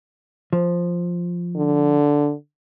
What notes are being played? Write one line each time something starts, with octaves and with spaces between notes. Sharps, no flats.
F3
D3